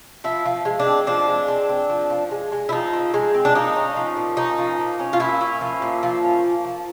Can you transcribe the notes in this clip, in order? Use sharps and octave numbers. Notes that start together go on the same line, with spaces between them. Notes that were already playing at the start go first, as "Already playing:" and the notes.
F3 E4
F3
G#3
D4
C4
F3 D4
G#3
C4
C4
F3
F3
G#3
G#3
E4
F3 D#4
C4
G#3
C4
D4
A#3 D#4
C#4
F3
A#2
C#4 D#4
F3
A#3
C#4
F4
A#2 E4
C#4
F3
A#2
F3
C#4
A#3
F3